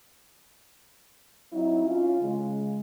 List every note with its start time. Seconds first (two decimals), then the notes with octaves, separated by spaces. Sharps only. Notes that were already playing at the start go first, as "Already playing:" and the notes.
1.53 F#3 C4 D#4 E4
1.86 C#4 F4
2.21 C#3 G#3